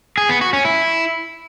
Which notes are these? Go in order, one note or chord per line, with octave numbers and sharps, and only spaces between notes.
G#4
B3
F#4
C#4
E4